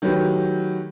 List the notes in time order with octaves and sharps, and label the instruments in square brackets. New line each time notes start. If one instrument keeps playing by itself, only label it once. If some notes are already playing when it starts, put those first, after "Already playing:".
[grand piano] D#3 F#3 A3 G4 B4